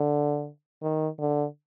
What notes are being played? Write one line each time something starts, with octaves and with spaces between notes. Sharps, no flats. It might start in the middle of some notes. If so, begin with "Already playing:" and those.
Already playing: D3
D#3
D3